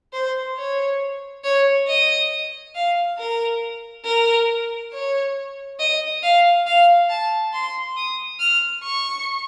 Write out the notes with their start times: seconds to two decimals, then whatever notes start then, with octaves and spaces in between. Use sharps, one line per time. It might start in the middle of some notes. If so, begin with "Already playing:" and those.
0.13 C5
0.57 C#5
1.44 C#5
1.88 D#5
2.75 F5
3.18 A#4
4.05 A#4
4.92 C#5
5.79 D#5
6.23 F5
6.67 F5
7.10 A5
7.53 C6
7.97 D#6
8.40 F6
8.83 C#6